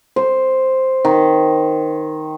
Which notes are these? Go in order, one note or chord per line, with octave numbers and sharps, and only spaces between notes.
C5
D#3